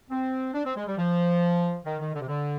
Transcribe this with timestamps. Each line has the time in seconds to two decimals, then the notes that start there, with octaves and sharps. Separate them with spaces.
0.10 C4
0.54 D4
0.65 C4
0.76 G#3
0.87 G3
0.98 F3
1.85 D#3
2.00 D#3
2.15 D3
2.21 C3
2.28 D3